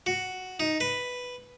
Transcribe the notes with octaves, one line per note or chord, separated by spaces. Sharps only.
F#4
D#4
B4